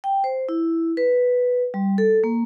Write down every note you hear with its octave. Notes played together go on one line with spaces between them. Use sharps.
G5
C5
E4
B4
G3
A4
A#3